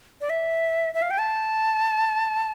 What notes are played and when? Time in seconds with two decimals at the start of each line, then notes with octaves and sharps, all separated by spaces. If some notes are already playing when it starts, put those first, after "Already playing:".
0.21 D5
0.30 E5
0.94 E5
1.02 F5
1.11 G5
1.18 A5